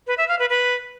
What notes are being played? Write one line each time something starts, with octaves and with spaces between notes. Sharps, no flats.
B4
E5
F5
B4
B4